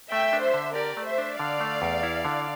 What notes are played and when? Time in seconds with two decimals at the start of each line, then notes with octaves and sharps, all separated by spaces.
0.11 A3 E5 G5
0.33 D4
0.43 C5 E5
0.54 D3
0.75 G4 A#4 D5
0.97 A3
1.07 C5 E5
1.18 D4
1.39 D3 D5 F5
1.60 A3
1.82 E2
2.03 E4
2.25 D3